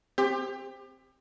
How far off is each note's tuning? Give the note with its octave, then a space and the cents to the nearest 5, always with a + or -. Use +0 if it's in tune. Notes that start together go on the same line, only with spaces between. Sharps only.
C4 +0 G4 +30